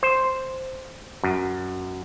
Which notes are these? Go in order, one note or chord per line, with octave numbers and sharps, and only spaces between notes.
C5
F#2